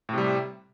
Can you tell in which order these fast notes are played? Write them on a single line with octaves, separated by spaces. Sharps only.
A2 C3 G3